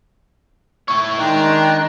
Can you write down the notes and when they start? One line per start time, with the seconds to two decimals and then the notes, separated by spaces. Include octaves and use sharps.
0.88 E4 C#5 C#6
1.20 D#3 G#3 D4 G5 A#5